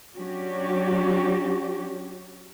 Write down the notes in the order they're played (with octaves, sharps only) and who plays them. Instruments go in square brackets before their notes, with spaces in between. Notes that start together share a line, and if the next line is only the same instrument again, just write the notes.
[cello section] F#3 C#4 D4 F#4 G4